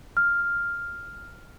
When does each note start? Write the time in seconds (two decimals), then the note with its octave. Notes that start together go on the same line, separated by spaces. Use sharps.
0.17 F6